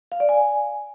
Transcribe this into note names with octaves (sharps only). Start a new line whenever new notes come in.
F5
D5
G#5